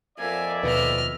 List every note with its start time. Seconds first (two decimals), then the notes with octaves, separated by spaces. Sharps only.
0.18 F2 A#3 D5 E5 G#5 G#6
0.63 D#2 B2 B4 D#5 F6